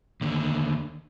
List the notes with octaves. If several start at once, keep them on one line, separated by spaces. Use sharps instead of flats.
D#2 D3